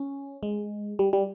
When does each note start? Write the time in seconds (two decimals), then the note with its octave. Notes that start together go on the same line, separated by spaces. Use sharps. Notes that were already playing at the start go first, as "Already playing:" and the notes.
Already playing: C#4
0.43 G#3
0.99 G3
1.13 G3